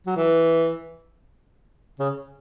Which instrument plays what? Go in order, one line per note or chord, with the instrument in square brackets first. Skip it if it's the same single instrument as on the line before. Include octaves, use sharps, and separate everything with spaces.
[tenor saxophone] F#3
E3
C#3